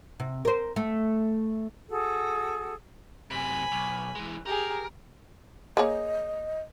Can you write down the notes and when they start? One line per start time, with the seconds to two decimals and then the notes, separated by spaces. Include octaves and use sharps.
0.20 C3
0.45 A#4 C5
0.76 A3
1.89 F#4 G#4 A4
3.31 F#2 C3 G#5 B5
3.72 B1
4.15 E3 G#3
4.46 G4 G#4 A#4
5.77 A#3 G#4 C#5 D#5